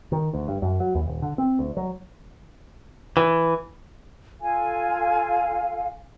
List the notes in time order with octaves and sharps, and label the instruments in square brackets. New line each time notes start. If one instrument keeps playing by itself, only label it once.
[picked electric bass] D#3
D2
G2
F#2
F#3
D#2
D#1
D3
C4
D2
F#3
[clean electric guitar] E3
[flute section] F4 A4 F5 G#5